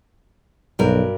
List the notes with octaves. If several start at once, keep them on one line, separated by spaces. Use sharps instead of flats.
B1 G2 F#4 A#4